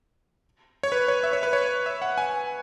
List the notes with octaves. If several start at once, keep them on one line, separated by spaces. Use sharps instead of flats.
C#5
B4
C#5
E5
C#5
B4
C#5
E5
F#5
G#5